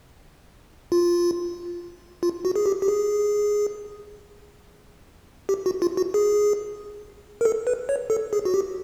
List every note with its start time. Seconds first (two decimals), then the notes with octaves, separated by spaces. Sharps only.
0.92 F4
2.23 F4
2.45 F#4
2.56 G#4
2.66 G4
2.82 G4
2.88 G#4
5.49 G4
5.66 F#4
5.82 F4
5.97 F#4
6.14 G#4
7.41 A#4
7.45 A4
7.67 B4
7.89 C#5
8.10 A4
8.33 G#4
8.45 F#4
8.54 G4